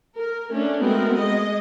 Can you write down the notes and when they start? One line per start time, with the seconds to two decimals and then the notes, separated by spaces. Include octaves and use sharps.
0.15 A#4
0.50 A3 C#4 D4
0.79 G#3 A3 B3 C4 F#4 A#4
1.16 G#3 D#5